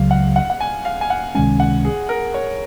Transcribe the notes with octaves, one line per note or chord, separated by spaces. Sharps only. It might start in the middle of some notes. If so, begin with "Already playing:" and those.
Already playing: C#2 C#3 F#3 F5
F#5
F#5
F#5
G#5
F5
G#5
F#5
C#2 C3 D#3 G#3 C#4 G#5
F#5
G#4
A#4
C#5